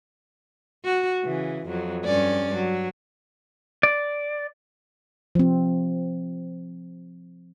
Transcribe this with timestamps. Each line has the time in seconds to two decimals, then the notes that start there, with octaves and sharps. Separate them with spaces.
0.84 F#4
1.24 C#3 E3
1.67 F2 F#3
2.05 G2 C#4 D5
2.55 F#3
3.83 D5
5.35 F3 C4